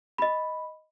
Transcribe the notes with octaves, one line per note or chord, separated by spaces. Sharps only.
D#5 B5